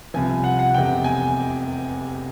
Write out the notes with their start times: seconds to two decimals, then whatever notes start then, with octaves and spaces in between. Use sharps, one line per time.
0.14 C2 C3 F3 G#5
0.44 F#5
0.59 F#5
0.74 F1 E2 C3 G5
1.04 G#5